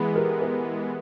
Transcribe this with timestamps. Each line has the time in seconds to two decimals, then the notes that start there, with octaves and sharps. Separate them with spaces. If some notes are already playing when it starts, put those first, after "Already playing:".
Already playing: E3 G#3 B3 G#4 B4
0.16 G4 A#4
0.42 G#4 B4